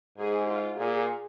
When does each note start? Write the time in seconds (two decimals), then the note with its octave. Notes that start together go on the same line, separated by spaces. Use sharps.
0.18 G#2 G#4
0.48 F4
0.78 A#2 G#4